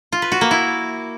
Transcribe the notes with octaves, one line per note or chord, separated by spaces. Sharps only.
F4
B4
F#4
A#3
E4